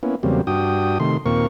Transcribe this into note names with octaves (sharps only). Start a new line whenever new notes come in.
A#3 B3 C#4 E4
E2 C#3 F#3 G3 A#3 C4
G2 D4 F#4 G5 D#6
C3 D#3 A3 C6
D#2 A#2 A#3 C4 A#4 C#6